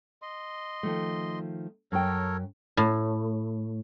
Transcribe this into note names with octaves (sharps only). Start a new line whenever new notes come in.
D#5 C6
D#3 F3 A3
F#2 A4 A#4 C#5 G5
A2